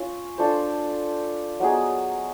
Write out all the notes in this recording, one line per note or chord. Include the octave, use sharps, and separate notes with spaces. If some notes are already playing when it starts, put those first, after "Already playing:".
Already playing: C#4 F4
D4 F4 A4 C5
F#3 B3 D#4 G#4